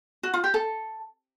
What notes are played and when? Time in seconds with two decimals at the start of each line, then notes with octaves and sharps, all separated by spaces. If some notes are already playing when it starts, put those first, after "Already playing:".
0.23 F#4
0.34 F4
0.44 G4
0.54 A4